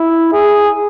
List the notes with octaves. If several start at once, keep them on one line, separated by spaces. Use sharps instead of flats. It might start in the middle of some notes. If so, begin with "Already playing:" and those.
Already playing: E4
G#4